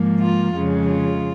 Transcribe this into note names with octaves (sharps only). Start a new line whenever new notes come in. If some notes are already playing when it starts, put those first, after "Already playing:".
Already playing: G#2 F3 A#3
F4
F2 C#3 G#3
F4